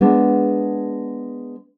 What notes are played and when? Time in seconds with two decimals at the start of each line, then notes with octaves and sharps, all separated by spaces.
0.01 G#3 B3 D4